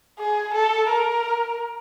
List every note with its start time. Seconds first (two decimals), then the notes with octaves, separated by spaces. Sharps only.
0.19 G#4
0.54 A4
0.90 A#4